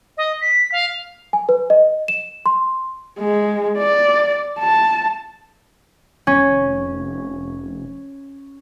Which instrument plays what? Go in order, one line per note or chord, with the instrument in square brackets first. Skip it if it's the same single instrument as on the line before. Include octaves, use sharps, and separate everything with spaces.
[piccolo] D#5
B6
F5
[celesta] G#5
B4
D#5
E7
C6
[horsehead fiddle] G#3
D5
A5
[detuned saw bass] F1 [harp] C#4